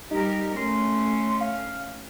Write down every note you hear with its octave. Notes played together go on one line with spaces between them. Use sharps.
G3 D#4 G4 A#4
A3 C#4 C6
F5